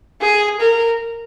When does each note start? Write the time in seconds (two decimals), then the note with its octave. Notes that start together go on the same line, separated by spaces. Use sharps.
0.21 G#4
0.60 A#4